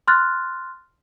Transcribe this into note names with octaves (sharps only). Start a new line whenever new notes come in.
C6 F6 F#6 A6